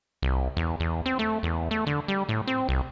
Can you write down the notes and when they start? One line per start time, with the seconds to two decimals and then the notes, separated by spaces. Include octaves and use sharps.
0.22 C2
0.57 E2
0.80 E2
1.06 C4
1.19 A3
1.43 E2
1.71 A3
1.87 D3
2.08 G3
2.29 A2
2.47 C4
2.69 C2